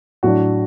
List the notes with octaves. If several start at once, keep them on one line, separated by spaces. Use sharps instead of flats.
A2 F#3 D4 F#4